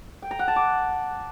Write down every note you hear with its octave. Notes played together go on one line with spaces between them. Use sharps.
G5
A#5
F#5
A5
D6